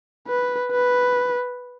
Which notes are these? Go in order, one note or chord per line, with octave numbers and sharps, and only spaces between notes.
B4
B4